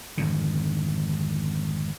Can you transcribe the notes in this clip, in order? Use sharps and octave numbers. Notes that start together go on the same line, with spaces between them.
G#1 F2 D3